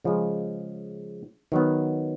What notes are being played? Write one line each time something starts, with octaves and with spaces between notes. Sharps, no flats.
C#3 F3 G#3
D#3 F#3 B3